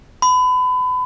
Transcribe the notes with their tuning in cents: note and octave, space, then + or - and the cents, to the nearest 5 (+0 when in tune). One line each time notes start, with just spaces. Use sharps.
B5 +30